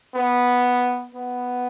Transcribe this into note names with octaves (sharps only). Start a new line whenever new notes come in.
B3
B3